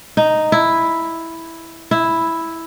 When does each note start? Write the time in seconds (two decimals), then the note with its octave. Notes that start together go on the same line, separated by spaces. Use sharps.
0.17 D#4
0.52 E4
1.91 E4